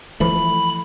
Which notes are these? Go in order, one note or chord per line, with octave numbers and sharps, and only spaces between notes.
E3 F3 A3 B5